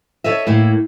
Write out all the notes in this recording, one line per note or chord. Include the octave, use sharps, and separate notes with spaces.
A4 C#5 D#5 E5
A2 A#3 E4